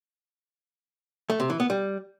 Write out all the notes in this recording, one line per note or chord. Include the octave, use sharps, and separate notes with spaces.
A3
C3
E3
B3
G3